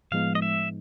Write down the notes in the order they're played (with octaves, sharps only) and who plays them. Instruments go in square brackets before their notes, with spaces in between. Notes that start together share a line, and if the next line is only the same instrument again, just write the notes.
[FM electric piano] A2 F3 G#3 B3 D#4 [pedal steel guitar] F5
[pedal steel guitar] D#5
E5